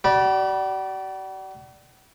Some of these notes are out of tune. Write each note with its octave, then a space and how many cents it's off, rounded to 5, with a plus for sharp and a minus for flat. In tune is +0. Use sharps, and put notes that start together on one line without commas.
F#4 +45 D5 +0 B5 -30